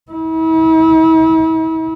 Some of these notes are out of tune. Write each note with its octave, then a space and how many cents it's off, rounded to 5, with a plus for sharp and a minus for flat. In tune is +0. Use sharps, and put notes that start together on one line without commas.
E4 -40